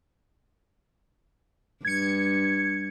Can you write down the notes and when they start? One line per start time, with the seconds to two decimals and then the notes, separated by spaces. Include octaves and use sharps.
1.85 G2 G#6 C#7